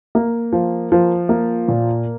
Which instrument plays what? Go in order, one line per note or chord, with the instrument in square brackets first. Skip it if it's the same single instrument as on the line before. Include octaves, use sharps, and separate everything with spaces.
[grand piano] A#3
F3
F3
A#3
A#2